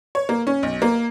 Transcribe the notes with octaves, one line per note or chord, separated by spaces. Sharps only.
C#5
A#3
C#4
B1
A#3